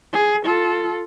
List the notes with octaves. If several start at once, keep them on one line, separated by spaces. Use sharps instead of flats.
G#4
F4 A4